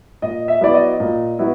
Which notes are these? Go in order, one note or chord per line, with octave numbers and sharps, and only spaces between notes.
A#2 D#5
E5
F#3 B3 E4 D5
D#5
A#2
F#3 B3 E4